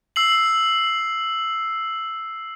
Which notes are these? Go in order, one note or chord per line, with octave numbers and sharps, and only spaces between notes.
E6 C7 F#7